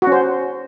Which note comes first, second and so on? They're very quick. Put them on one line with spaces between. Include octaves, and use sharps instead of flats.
F#4 C#4 C5